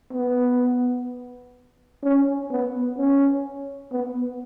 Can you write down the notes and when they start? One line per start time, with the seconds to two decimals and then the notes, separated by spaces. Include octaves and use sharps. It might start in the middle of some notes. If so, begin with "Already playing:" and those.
0.13 B3
2.03 C#4
2.51 B3
2.98 C#4
3.92 B3